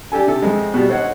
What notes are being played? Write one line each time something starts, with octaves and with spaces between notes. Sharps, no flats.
D4 G4 A4 G#5
C3 A4
F2 G#3 C4
B2 G3
A4 C5 C#5 D#5 F#5